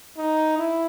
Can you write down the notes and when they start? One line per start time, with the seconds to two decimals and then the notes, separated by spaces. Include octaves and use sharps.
0.17 D#4
0.58 E4